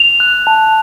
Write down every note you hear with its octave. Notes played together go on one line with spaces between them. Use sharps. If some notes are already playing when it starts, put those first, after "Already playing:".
Already playing: F7
F#6
A5